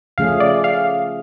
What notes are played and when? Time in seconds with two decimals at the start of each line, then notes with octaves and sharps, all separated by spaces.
0.18 C#3 F3 A3 C#4 G#4 F5
0.40 D5
0.64 F5